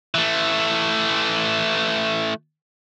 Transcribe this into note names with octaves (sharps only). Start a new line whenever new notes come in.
E3 A3